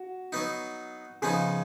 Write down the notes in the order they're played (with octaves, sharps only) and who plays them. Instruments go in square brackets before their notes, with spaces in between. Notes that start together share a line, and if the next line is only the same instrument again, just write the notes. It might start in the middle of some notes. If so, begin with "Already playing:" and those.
Already playing: [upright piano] F#4
[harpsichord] F#3 B3 D#4
[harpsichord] C#3 F3 B3 D#4 [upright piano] G#4